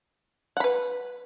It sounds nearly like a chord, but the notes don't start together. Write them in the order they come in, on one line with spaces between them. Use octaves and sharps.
F#5 B5 B4